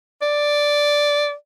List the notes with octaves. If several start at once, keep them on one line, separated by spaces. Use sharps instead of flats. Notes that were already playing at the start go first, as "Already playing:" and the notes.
D5